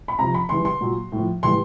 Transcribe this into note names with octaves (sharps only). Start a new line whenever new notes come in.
B5
C3 F3 A#5
B5
C#3 E3 G3 C6
C6
A#2 F#3
A2 F3
A2 E3 G3 C6